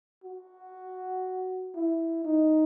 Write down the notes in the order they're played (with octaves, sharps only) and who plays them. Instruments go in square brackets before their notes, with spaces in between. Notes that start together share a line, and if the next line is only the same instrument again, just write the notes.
[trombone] F#4
E4
D#4